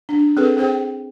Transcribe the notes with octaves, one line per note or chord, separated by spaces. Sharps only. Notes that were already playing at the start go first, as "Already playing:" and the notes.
D4
C4 G#4 A4 B4
C4 G#4 C5 G5